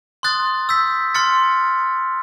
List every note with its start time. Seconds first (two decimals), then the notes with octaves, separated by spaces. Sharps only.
0.23 C6 D#6 F#6 A6
0.69 E6 G6 B6
1.14 C6 F6 A6 C#7